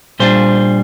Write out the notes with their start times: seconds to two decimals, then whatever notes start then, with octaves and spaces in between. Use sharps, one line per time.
0.19 A#2 G3 D4 F4 C5